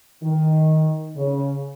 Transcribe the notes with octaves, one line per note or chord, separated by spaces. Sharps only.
D#3
C#3